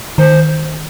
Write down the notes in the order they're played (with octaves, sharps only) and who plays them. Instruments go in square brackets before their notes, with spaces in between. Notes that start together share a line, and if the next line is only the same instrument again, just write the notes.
[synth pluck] D#3 [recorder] C5